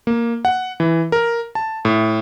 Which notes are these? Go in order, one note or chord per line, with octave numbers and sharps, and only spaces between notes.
A#3
F#5
E3
A#4
A5
A2